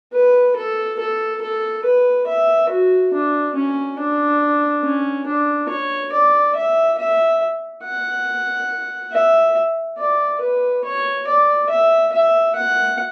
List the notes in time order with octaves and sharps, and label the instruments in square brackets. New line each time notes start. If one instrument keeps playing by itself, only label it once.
[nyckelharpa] B4
A4
A4
A4
B4
E5
F#4
D4
C#4
D4
C#4
D4
C#5
D5
E5
E5
F#5
E5
D5
B4
C#5
D5
E5
E5
F#5